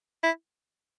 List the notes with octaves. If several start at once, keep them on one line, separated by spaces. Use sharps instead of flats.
E4